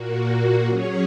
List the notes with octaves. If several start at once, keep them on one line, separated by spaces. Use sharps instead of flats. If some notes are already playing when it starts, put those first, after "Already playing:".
Already playing: A#2 A#3 F#4
F#3 C#4 G#4 C#5